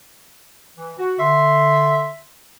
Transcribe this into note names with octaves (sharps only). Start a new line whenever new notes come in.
E3
F#4
D3 E5 C6